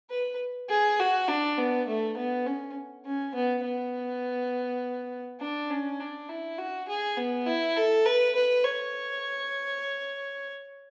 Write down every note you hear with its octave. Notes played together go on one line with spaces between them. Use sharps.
B4
G#4
F#4
D4
B3
A3
B3
C#4
C#4
B3
B3
D4
C#4
D4
E4
F#4
G#4
B3
E4
A4
B4
B4
C#5